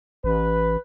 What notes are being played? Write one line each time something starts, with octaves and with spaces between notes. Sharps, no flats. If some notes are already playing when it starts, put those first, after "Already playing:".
A1 B4